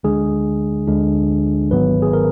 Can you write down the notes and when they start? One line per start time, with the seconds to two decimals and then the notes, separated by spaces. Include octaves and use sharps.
0.03 D2 D3 G#3 D4 G#4
0.87 D2 D3 G#3 D4
1.71 G#1 G#2 D#3 F#3 B3 B4
2.02 G#4
2.13 A#4